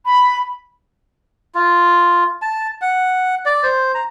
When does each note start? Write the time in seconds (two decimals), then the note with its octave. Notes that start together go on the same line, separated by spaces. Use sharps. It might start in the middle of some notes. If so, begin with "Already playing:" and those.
0.05 B5
1.55 F4
2.42 A5
2.81 F#5
3.46 D5
3.63 C5
3.94 A#5